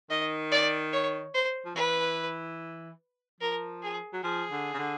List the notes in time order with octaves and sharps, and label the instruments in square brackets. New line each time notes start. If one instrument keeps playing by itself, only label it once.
[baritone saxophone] D#3 [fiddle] D#5
[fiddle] D5
C#5
C5
[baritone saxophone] F3
[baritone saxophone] E3 [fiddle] B4
[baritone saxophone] F3 [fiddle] A#4
[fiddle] G#4
[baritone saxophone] F#3
[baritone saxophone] F3 [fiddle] G#4
[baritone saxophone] D3
C#3
D3